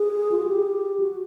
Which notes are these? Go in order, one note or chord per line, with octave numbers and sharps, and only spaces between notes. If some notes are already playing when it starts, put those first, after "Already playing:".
Already playing: G#4
F4
F#4
G4
F#4